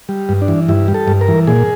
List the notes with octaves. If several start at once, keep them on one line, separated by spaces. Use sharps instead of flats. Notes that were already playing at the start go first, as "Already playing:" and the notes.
G3
G2
D4
E3
G2 E4
G3
A4
G2
A#4
E3
A#2 G#4